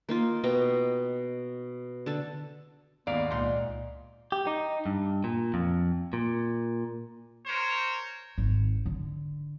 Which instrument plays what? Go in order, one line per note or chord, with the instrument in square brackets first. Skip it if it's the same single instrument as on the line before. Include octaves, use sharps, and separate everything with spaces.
[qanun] A#3 D#4 F4
B2 D#5 G5 A#5
D3 A4
[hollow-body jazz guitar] D#2 [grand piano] G#2 F5 F7 [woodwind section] B3 [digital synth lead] D5
[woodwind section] C#2 [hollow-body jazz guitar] A#2 C6
[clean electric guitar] G4
D#4
G2
A#2
F2
A#2
[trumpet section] A#4 C5 C#5
[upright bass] G#1
D3